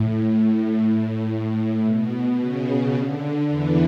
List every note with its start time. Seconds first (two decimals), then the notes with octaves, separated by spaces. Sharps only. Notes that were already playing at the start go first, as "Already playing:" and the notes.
Already playing: A2
0.74 A2
1.84 B2
2.40 C#3
2.95 D3
3.50 E2 E3